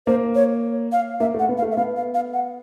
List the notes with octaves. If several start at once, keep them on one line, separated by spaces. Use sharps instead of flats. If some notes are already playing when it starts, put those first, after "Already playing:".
A#3 C5
C#5
F5
A#3 E5
A3
F#5
B3
F5
A3
E5
B3 F5
F5
F5
F#5